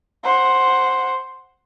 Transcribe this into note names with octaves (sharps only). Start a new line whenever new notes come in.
C5 F#5